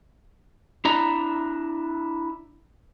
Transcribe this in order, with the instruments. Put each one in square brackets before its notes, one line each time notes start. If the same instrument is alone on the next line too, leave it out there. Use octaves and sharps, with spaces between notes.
[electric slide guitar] D4 E4 A#5